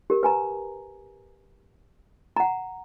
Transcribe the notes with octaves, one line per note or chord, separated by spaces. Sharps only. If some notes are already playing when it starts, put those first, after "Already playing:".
G4 A#4
B4 G#5 A#5
F#5 A#5